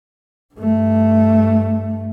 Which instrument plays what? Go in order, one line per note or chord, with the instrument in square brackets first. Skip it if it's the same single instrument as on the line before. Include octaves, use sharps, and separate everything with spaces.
[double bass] G2 A3